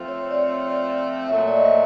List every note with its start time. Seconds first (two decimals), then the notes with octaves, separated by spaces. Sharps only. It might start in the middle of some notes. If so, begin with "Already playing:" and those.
Already playing: F3 A3 C4 F4
0.08 C#5
0.31 D5
0.38 C#5
0.68 D5
1.28 A#2 F#3 A3 E5
1.48 D5
1.56 D#5
1.65 E5